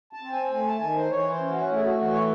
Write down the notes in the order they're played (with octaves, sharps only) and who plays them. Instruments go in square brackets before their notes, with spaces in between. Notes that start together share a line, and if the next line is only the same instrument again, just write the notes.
[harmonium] A5
C4
G#5
A3 G#5
A5
D#3 G#5
C5
E3 C#5
C5
C#4
F#4
A3 E4
G#4
F#4
E3 F#4
C#5